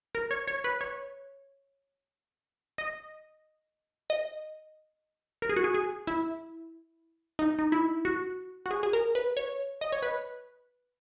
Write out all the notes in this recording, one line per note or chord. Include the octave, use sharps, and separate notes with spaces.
A#4
C#5
C#5
B4
C#5
D#5
D#5
A#4
G#4
F#4
G#4
G#4
E4
D#4
D#4
E4
F#4
F#4
G#4
G#4
A#4
B4
C#5
D#5
C#5
B4